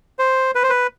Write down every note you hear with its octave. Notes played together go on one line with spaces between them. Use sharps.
C5
B4
C5
B4